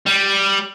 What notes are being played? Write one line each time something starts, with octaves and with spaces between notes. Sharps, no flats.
G3